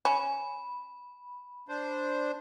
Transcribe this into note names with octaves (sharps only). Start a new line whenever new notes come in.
C#4 B5
D4 C5